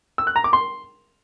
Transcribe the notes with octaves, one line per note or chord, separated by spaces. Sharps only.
E6
F#6
A#5
D6
C6